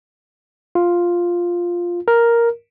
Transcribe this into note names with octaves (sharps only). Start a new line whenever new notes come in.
F4
A#4